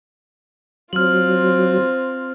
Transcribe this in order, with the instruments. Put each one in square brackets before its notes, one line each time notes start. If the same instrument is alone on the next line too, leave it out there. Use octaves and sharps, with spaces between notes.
[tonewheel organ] F#3 [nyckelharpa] C4 F4 [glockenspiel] F6 F#7